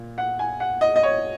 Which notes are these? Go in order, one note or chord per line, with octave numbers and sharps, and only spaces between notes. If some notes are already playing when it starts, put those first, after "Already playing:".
Already playing: A#2
F#5
G#5
F#5
D#5
D#5
C#5